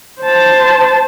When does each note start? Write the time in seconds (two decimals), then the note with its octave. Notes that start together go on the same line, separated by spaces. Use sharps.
0.21 C5 A5